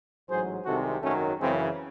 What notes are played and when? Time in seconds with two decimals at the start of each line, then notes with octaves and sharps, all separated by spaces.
0.28 A1 G#2 F#3 G#4 C5
0.65 C2 C3 D#3 G#3 F#4 A4
1.02 G#1 F#2 D#3 F#3 A3 C#4
1.38 F#2 C#3 E3 G#3 C4